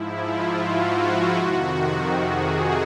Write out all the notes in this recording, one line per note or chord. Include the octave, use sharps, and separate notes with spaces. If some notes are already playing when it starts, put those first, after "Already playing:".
Already playing: G#2 F3 E4
F4
F#4
F2 C3 D#3
G#4